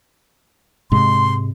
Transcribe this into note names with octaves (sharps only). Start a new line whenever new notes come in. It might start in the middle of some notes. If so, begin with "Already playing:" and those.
G#2 C3 G#3 C6